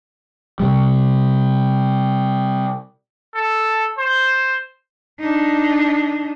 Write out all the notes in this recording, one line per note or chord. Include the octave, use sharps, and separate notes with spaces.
C3 G3
A4
C5
D4 D#4